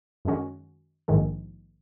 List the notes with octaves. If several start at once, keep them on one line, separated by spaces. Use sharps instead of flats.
F#2 D#3 G#3 C#4 F#4
A#1 G#2 D#3 G#3